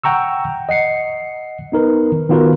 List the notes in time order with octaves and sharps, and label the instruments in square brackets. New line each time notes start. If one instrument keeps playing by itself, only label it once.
[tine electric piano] F#5 G5 A#5 C#6 E6
D#5 F#5 C7 C#7
B3 D#4 A#4 B4
D#3
D#3 B3 F4 F#4 A#4 B4